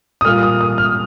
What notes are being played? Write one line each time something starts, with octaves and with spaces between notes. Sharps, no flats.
D#6
A#2 G3 A#3 F4 F6
D#6
D#6
F6